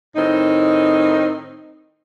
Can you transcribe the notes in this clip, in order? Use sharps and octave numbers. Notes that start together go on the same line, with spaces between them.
A2 D#3 C4 D#4